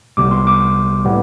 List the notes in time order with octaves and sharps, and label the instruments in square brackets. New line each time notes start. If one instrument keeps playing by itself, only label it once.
[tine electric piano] C2 C3 G3 B3 D6
C6
D6
A2 G3 B3